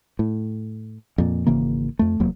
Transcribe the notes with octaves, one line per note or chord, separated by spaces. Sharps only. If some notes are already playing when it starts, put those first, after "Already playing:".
A2
F2 A#2
G#1 C#3 E3 A#3
F2 A3
F1 E2 F#3 A#3